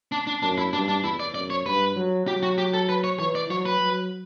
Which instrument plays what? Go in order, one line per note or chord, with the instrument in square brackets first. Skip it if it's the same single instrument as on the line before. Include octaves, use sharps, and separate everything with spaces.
[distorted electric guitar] D4
D4
[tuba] F#2 [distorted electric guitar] D4
[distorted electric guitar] E4
[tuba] G2 [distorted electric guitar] D4
[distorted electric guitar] D4
[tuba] E2 [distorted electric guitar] E4
[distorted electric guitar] D5
[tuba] F#2 [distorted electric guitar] D5
[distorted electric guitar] C#5
[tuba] G2 [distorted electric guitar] B4
[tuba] F#3
[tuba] F#3 [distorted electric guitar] G4
[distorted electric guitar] F#4
G4
A4
B4
C#5
[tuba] E3 [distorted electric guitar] C#5
[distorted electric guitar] D5
[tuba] F#3 [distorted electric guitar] C#5
[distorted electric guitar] B4
[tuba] F#3